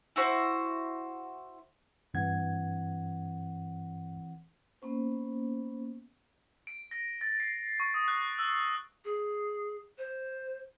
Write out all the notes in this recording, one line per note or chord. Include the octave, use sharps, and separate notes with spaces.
E4 F#4 C5
G2 E3 C4 F#5 G#6
A#3 B3 C#4 C5
D7
A#6
A6
C7
C#6
D#6
F#6
E6
G#4
C5